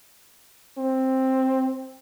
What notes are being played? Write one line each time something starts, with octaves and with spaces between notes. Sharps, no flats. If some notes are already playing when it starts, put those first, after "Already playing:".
C4